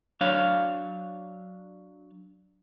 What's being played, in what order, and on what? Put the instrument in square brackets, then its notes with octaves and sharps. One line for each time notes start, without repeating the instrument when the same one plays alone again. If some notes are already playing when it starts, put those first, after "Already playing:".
[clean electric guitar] F#3 D4 C#5 F5